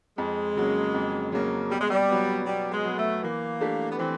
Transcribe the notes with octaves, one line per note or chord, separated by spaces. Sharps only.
F2 G#3
C#3 F#3 A#3 C#4
F2
C#3 F#3 A#3 C#4
B2 G3
G#3
G3
F#3 B3
B2 G3
G#3
F#3 B3
A3
E3 A#3
A3 D4 G4
B3
E3 C4